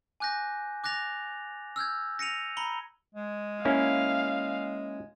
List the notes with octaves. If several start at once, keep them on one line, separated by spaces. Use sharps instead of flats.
G#5 D6 F#6 G6 A#6
D6 F#6 A6 A#6 F7
E6 F6 G6 G#6
A#6 C#7 D#7 F7
A#5 B5 C#7 G7
G#3
A#3 C#4 E4 F5